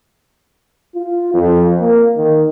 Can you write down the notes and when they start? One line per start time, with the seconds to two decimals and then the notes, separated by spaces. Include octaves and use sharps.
0.95 F4
1.34 F2
1.80 A#3
2.17 D#3